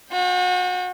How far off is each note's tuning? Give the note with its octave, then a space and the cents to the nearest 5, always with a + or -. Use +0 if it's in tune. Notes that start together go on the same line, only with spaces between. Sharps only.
F#4 -35 G5 +10